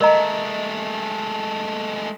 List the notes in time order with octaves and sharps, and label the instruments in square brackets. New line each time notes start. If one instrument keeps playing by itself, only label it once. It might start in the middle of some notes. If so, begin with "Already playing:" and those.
[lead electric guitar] G#3 A3 [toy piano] A#4 D#5 A#5